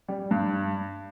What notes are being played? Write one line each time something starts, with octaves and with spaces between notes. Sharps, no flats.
G3
G2